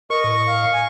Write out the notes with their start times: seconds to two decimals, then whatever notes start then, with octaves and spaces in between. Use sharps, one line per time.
0.10 A#4 D#5 C#6
0.24 A2
0.47 F5
0.73 G#5